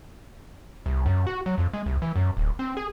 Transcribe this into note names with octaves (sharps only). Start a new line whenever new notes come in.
C2
F#2
F#4
F#3
F2
G#3
C2
E3
F#2
D1
C4
G#4